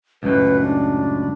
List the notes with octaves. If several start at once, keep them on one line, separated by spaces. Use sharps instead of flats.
C#2 F#2 A2 B4
D4